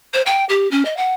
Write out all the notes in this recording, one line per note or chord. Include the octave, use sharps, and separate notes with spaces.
C5
G5
G4
C#4
D#5
F#5